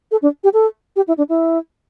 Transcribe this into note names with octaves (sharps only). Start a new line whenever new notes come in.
A4
D4
G4
A4
G4
E4
D4
E4